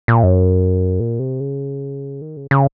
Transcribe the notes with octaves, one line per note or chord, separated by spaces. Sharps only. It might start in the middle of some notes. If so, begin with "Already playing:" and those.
A#2
F#2
A#2
C3
C#3
D#3
C#3
C#3